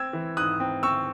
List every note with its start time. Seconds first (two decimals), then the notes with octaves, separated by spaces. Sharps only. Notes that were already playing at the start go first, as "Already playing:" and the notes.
Already playing: C4 E6 G#6
0.13 E3
0.37 G#2 D#6 F#6
0.60 C4
0.83 C4 C#6 E6